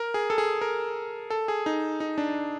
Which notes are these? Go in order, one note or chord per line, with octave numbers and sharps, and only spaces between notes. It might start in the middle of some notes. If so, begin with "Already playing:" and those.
Already playing: A#4
G#4
A4
G#4
A#4
A4
G#4
D#4
D#4
D4